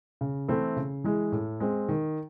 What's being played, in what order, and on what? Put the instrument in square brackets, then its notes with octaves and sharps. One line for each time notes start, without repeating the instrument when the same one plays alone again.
[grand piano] C#3
E3 A3 C4 E4
C#3
E3 G#3
A2
G#3 C4
D#3